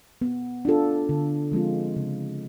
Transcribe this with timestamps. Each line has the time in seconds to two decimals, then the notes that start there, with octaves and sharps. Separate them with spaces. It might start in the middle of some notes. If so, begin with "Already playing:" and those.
0.21 B3
0.65 D4 F4 A4
1.09 D3
1.52 F3 G#3 C4 F4
1.96 C#3